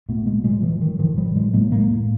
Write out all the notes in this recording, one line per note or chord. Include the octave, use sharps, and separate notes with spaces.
A#2 A3 B3
A#2 G#3 A#3
A#2 F#3 G#3
A#2 E3 F#3
A#2 D#3
A2 D#3 F3
A2 F3 G3
A2 F#3 G#3
A2 G#3 A#3
A2 G#3 A#3
A2